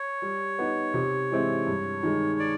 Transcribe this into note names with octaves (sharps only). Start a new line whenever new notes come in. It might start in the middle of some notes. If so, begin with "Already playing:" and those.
Already playing: C#5
G3
B3 D#4
C3
E3 G#3 C4 E4
G2
D#3 G#3
D5